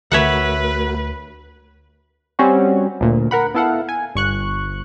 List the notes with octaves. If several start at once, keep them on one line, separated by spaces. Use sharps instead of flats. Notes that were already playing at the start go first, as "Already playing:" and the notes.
D2 A3 F#4 A#4 B4 C#5 E5 F#5
G3 C4 C#4 F#4
D2 A#2
A#4 F#5 B5
B3 E4 A4 F5 F#5
G#5
G1 C#6 F#6